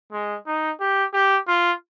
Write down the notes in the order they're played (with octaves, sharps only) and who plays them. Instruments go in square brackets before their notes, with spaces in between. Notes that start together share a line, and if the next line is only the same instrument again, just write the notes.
[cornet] G#3
D#4
G4
G4
F4